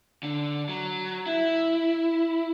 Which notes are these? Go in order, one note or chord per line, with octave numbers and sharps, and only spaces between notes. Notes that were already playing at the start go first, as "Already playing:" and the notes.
D3
F#3
E4